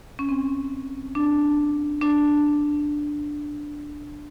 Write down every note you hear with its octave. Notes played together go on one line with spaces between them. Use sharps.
C#4
C4
D4
D4